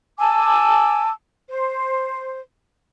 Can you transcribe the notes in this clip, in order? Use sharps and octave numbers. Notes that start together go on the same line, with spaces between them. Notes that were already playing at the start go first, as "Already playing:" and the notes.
G#5 A5 D6 E6
C5